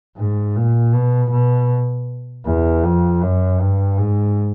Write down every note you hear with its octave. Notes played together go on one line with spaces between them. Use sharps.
G#2
A#2
B2
B2
E2
F2
F#2
G2
G#2